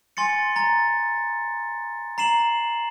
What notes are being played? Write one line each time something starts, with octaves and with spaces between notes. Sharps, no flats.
G#5 C6 A6 C#7
A#5 A6
A#5 C7 E7 F#7